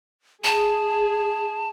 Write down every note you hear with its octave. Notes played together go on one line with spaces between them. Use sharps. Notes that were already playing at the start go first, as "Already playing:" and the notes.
G#4 A5